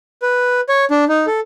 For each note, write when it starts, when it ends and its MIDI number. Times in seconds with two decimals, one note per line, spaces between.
0.22 0.61 71
0.69 0.85 73
0.91 1.05 62
1.09 1.26 63
1.27 1.40 69